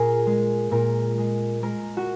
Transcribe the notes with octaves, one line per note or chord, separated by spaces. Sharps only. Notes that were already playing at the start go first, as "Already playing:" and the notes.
Already playing: A#2 G#4 A#4
G#3
A#2 A#4
G#3
G#3 A#4
F#4